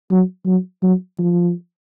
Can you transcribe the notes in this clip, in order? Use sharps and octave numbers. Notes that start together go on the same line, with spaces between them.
F#3
F#3
F#3
F3